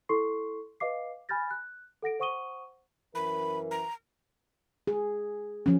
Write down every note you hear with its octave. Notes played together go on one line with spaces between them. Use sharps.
E4 A4 C6 C#6 C7
B4 D#5 F5 D6 C7
G#5 B5 F6 G6 A6 A#6
F#6
A4 F#5 A#6 D7
C5 F#5 C#6 D#6 D#7 G7
F#2 E3 A#4 B5
A#5
G#4
F3 C#4